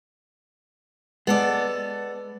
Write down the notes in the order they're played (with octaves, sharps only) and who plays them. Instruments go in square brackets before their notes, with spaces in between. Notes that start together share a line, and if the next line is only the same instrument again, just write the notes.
[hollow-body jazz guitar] G#3 [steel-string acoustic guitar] B3 A4 D5